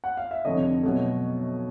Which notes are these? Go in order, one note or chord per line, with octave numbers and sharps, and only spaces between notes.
F#5
F5
E5
F1 F2 D3 C#5 D#5
B2 F#3 A3